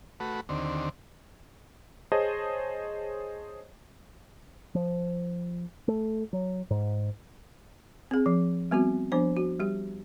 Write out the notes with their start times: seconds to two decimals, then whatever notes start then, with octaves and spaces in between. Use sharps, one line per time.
0.20 A3 F#4 B4
0.49 D#2 D3 C4
2.12 G#4 C5 C#5 D#5 A5
4.75 F3
5.88 A3
6.33 F#3
6.70 G#2
8.11 C4 G#4
8.26 F3
8.71 G3 B3 C4 F#4
9.12 F3 B3 D4 C5
9.37 F#4
9.60 G3 G4